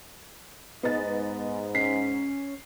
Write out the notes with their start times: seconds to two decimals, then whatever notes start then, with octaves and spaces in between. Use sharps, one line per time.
0.83 G#2 B3 D#5 A6
1.75 C#4 B6 C7